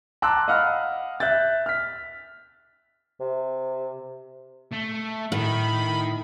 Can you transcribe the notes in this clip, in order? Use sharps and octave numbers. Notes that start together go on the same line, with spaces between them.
A5 A#5 C6 D6 E6 F#6
D#5 F5 F#5 B5 F6
E5 F#6 G6 A6
F6 B6
C3
A3
A2 D#3 B5